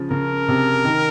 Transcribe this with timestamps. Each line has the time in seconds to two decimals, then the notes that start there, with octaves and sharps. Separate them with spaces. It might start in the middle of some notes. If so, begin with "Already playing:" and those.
Already playing: C#3 F3
0.11 C#3 A#4
0.48 C3
0.85 D#3